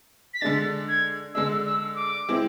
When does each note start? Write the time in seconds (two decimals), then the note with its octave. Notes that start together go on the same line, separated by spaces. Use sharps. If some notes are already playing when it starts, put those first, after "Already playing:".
0.34 B6
0.41 D3 G#3 D4 A6
0.88 G#6
1.34 D3 G#3 D4 E6
1.66 E6
1.92 E6
1.96 D6
2.29 G#3 C4 E4